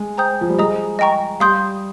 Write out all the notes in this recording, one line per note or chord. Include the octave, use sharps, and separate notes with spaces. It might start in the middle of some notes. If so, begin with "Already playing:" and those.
Already playing: G#3
C5 G5 A#5 D#6 G6
F3
G3
G#3 G#4 C5 D#5 A#5 D#6
D#5 G5 A#5 C#6
G3 F5 C6 D#6 G6